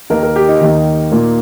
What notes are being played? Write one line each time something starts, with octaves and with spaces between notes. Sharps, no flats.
D#2 D#3 A#3 A#4
A#4
G4
D#4
D#2 D#3 A#3
A#2 A#3